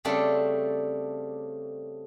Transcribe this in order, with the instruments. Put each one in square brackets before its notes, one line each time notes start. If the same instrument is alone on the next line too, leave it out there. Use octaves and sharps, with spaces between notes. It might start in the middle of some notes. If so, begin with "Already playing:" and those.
[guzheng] C#3 G3 A3 C4 D4 A4